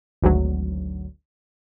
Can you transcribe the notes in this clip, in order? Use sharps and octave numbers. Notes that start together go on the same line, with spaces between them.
G#1 D2 F#3